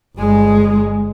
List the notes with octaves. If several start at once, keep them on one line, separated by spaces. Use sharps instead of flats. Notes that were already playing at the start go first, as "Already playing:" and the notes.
G1 G#3